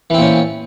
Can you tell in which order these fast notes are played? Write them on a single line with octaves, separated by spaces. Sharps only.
E3 C4 A#2 C#4